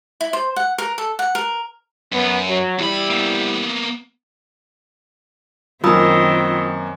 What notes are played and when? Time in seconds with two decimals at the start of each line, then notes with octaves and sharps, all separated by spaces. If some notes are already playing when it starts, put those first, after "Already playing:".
0.21 E4
0.33 C5
0.56 F#5
0.78 A#4
0.98 A4
1.19 F#5
1.35 A#4
2.12 F#2 B3
2.46 F#3
2.79 E2 G3 E4 B5
3.10 A#3 B3
5.84 F#2 D#3 A#3 C4 F4 B5 D#6 E6